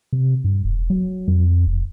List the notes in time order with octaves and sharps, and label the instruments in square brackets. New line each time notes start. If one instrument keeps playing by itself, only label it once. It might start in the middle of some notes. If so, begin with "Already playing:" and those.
[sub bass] C3
G2
E1
F#3
F2
E1